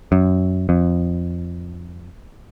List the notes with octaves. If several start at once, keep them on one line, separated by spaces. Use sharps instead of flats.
F#2
F2